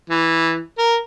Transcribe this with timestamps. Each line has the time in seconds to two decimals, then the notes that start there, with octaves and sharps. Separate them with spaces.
0.10 E3
0.78 A#4